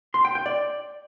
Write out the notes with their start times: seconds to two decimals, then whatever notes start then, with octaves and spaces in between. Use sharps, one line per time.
0.14 C6
0.25 G5
0.35 G5
0.46 D5